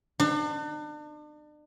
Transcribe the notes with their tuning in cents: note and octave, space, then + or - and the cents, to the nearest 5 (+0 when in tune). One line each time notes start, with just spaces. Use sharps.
D4 +40